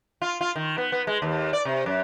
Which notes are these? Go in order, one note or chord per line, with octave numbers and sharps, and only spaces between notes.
F4
F4
D#3
B3
B3
G#3
D#2
D5
C3
F#2